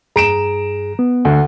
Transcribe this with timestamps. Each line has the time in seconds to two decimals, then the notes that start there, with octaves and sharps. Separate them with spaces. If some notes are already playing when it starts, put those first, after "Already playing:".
0.16 G2 G#4 A#5 D7 E7
0.99 B3
1.25 D2 F#5